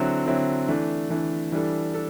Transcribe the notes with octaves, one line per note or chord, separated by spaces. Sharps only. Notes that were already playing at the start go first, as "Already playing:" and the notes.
Already playing: D3 F#3 C4 E4
D3 F#3 C4 E4
E3 A3 D4
E3 A3 D4
E3 G3 D4 A4
D4 A4